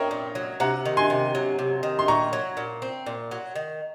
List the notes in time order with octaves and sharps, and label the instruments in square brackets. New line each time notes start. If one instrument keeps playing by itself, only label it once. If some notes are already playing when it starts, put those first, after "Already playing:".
Already playing: [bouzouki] C4 [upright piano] A#4 C#5 D#5
[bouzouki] A#2
F#3
[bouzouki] C3 [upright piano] F#5 A#5
[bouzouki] D#3
[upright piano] G#5 C6
[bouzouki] C3
F#3
C3
D#3
[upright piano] C6
[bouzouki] A#2 [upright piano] A#5 C#6
[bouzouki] F#3
A#2
C4
A#2
F#3
D#3